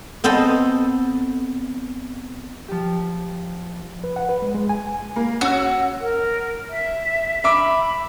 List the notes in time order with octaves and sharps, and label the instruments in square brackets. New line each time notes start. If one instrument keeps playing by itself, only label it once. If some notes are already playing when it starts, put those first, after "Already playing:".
[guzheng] B3 C4 A4 C5 D#5
[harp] F3 G4
[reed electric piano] B4
F#5
B4
G#3
G#3
G#5
[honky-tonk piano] A#3
[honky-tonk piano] C#4 E6 [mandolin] F#4
[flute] A#4
E5
[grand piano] E5 D6 [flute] B5